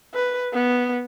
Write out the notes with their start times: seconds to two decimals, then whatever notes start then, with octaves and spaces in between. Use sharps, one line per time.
0.14 B4
0.54 B3